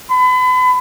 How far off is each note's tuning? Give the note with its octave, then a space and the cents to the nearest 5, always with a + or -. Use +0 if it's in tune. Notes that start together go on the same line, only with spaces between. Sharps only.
B5 +35